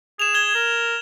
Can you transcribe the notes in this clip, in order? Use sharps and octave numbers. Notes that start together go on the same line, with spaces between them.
G#4 E7 F7
G#6 G7
A#4